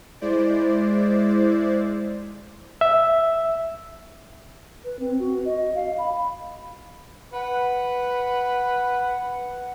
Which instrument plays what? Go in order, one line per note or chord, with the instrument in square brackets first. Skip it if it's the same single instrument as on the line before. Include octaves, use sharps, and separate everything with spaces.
[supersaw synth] G#3 E4 C5 D5
[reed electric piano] E5
[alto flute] B4
C4
F#4
D#5
F5
B5
[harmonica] B4 [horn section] F#5